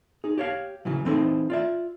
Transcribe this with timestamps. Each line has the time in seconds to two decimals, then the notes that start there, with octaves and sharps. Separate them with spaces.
0.24 D#4 G#4
0.38 G4 C#5 F5
0.85 C#3 E3 F#3
1.05 E3 C4 D#4 A4 C5
1.50 F4 D5 E5